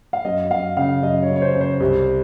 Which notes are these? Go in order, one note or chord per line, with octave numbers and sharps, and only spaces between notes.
F5
F#2 D#5
F#2 F5
C#3 F5
F#2 D#5
C#5
C#3
C#5
C5
C#3
C5
C2